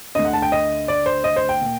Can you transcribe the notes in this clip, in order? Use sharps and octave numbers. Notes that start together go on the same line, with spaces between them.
D2 D3 D#5
F#5
A5
G5
D#5
D5
C5
D#5
C5
G5
A#2